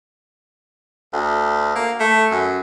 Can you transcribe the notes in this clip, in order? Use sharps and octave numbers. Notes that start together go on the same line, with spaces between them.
D2
A#3
A3
F#2